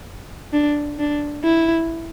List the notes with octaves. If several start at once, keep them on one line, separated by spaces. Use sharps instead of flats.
D4
D4
E4